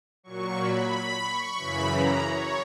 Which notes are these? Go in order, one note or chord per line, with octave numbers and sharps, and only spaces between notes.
A#2 F#3 C#6
B5
C#6
F#2 C#3 E3 B5
A#5
C#5